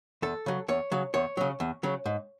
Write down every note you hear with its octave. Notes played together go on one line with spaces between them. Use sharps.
E2 A4
C#3 F#3
E2 C#5
C#3 F#3
E2 C#5
C#3 F#3
E2
C#3 F#3
G#2